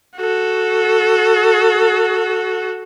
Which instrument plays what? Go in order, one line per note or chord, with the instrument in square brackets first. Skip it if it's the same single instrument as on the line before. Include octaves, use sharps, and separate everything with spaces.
[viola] F#4 A4